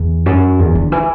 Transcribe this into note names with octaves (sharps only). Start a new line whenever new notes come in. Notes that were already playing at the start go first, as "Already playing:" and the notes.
Already playing: E2
F#2
E2
D3
E3